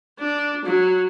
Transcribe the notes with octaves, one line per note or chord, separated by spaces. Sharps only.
D4
F#3